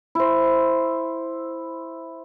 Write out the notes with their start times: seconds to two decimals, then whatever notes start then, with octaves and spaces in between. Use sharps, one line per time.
0.15 E4 C5